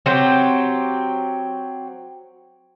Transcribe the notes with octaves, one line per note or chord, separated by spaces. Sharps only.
F#3 C4 G4